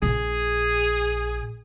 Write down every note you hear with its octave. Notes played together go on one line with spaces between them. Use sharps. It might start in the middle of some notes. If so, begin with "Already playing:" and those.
A#1 G#4